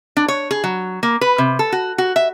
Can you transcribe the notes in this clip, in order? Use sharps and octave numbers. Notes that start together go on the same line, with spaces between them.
D4
C#5
G#4
F#3
A#3
B4
C3
A4
F#4
F#4
E5